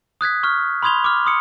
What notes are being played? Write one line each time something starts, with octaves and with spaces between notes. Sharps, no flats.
D#6 F#6 G#6 B6
C#6 F6
B5 C6 D#6 G#6 F7 G7
D6 F6
C6 D#6 C#7